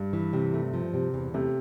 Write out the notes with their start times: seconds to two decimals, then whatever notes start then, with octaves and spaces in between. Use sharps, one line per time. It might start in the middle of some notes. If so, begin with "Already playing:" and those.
Already playing: G2
0.13 E3
0.33 C3
0.54 A3
0.73 F3
0.94 C3
1.14 E2
1.34 C3 A3